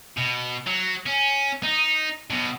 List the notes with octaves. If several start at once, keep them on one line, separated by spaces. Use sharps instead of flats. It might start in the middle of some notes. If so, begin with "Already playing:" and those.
B2
F#3
C#4
D#4
B2 F#3